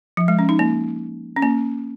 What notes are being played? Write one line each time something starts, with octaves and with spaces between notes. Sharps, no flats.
F3
G#3
C#4
D#4
A#3
C#4
A#3